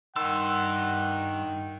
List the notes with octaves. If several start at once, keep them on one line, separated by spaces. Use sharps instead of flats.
G2 D#3 F#5 A5 C6 E6